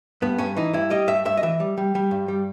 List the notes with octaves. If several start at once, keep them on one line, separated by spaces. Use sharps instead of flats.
G2 B3
G2 C#4
E3 D#4
G2 E4
G3 D#5
G2 E5
G2 E5
D#5
E3 E5
G3
G3
G3
G2
G3